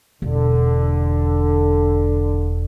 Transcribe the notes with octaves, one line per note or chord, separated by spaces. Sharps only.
E1 D3